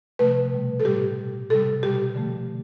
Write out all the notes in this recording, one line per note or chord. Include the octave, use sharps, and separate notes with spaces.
C3 F3 A3 B4
B2 G3
A4
A2 G3 G4
B2 G3
C3 G3 A4
B2 G3 G4
D3 F3 A3